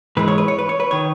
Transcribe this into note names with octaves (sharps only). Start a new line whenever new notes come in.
G#2 E3 G#3 B4
C#5
B4
C#5
B4
C#5
B4
D#3 C#5